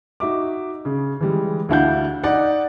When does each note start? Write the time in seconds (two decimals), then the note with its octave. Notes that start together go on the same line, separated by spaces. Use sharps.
0.20 D#4 F#4 E5 D6
0.85 C#3
1.20 E3 G3 G#3
1.69 D2 D4 E4 F5 F#5 G6
2.24 D#4 D5 F#5